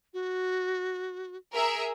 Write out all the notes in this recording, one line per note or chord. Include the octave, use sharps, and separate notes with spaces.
F#4
G#4 A#4 E5